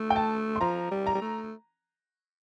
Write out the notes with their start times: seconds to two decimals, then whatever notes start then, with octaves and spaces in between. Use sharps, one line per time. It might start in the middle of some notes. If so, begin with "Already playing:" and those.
Already playing: A3
0.10 G5
0.16 A5
0.56 C6
0.61 F3 A#5
0.91 G3
1.07 A#5
1.14 G3
1.22 A3